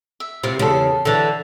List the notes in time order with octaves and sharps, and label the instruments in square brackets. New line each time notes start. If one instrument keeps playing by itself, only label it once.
[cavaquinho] E5
[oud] C3 [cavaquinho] E4 F4 F5
[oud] E2 C#3 [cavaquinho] A4 F5
[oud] D3 E3 [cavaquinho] E5 A5